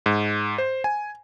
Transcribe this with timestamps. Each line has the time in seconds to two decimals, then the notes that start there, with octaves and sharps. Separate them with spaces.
0.06 G#2
0.58 C5
0.84 G#5